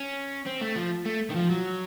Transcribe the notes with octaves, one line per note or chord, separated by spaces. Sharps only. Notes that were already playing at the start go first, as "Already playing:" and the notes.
Already playing: C#4
C4
A3
F3
A3
D#3
F3
F#3